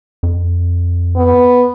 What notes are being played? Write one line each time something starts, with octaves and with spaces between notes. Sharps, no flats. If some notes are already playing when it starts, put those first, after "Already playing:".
F2
B3